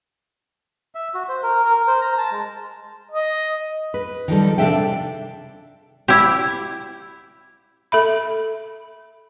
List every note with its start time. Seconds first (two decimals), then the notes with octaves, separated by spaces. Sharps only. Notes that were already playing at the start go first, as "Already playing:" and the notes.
0.95 E5
1.14 F#4
1.29 C5
1.43 A#4
1.64 A#4
1.87 C5
2.01 A#5
2.18 A5
2.31 G#3
3.11 D#5
3.94 B4
4.28 D#3 F3 G3 A4
4.58 C3 D4 A4 E5 F5 G5
6.08 E4 G4
7.92 A4 E5 B5